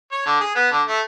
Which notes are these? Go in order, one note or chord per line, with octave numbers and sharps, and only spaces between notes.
C#5
D3
G#4
B3
D3
A3